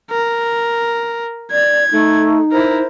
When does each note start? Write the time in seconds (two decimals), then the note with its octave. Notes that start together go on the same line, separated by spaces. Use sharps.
0.11 A#4
1.51 D5 G#6
1.92 A3 D#4
2.52 E4 A#4 C5